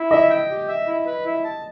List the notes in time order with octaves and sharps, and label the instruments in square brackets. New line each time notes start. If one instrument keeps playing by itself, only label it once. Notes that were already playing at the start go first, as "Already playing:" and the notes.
Already playing: [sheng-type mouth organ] E4
[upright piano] D#5 [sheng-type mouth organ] E5
[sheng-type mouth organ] G5
G4
E5
E4
B4
E4
A5